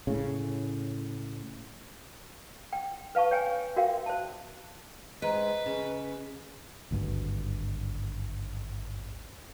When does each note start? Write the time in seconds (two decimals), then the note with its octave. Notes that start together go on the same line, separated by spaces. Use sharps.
0.07 A2 C#3
2.73 G5
3.15 B4 F5 A5 C#6
3.31 C#5 G5 G#5
3.77 F#4 A#4 E5 F5 G5
4.06 C5 A5
5.22 G#2 B4 D#5 A#5
5.66 C#3
6.91 G#1 D2 G2